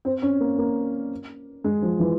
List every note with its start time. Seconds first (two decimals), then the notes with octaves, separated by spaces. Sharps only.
0.05 C4
0.22 C#4
0.40 A#3
0.58 A#3
1.64 G#3
1.82 F3
2.00 E3